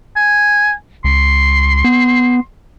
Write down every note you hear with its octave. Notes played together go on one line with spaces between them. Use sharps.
G#5
C#2 C6
B3